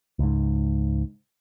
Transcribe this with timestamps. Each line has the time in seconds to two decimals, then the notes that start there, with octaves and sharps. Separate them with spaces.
0.19 C#2 G#2